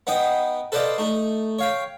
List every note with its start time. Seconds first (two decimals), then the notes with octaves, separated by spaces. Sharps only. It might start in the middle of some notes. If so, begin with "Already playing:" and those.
0.07 B3 D#4 D#5 G5
0.72 A4 B4 C5 D5 D#5 F5
0.98 A3 D#4
1.59 C#5 F5 G5